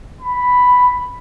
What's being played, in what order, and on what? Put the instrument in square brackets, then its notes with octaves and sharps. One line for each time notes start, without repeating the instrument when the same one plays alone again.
[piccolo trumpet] B5